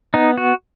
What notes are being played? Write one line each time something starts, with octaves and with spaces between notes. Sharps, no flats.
B3 D#4
F#4